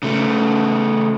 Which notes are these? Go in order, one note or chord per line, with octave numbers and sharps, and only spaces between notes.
C#3 A3